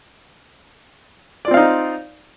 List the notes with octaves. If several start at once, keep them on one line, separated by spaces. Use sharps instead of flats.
C4 D#4 F4 D5 F5